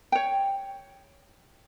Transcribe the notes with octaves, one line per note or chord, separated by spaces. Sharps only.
C#5 G5